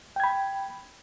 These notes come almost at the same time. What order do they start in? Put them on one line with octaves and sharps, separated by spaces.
G5 G#6 B5